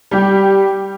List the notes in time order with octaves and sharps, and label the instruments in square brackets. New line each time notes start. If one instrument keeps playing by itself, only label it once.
[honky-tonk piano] G3 G4